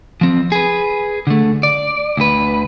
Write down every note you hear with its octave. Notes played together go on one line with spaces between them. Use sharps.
F3 C4
G#4 B4
D3 A3
D5
D2 B4